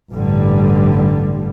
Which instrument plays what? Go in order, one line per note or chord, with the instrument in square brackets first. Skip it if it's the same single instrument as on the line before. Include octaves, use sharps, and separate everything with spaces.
[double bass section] A1 G2 D3 G3